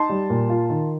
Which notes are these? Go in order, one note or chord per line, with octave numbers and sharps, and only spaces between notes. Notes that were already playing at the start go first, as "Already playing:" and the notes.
Already playing: D#4 A5 C6
G3
A#2
F4
D#3